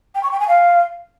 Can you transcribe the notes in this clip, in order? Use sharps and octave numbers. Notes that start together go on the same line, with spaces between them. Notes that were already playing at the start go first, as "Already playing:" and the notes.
G5
C#6
G5
G#5
F5